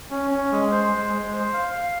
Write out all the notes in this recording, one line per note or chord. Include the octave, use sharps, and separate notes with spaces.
C#4
C#4
G#3
C5
G#3
G#3
C5
F5
F5